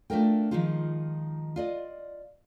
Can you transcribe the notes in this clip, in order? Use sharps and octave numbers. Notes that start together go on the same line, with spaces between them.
A3 D4 F4 A#4 G5
D#3 F3 G#3 D#4 F4
F4 D5 D#5